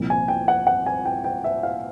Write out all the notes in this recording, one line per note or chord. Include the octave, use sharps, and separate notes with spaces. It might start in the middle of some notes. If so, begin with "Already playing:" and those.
Already playing: C2 A#2 F3
G#5
G5
F#5
F#5
G#5
G5
G5
E5
F5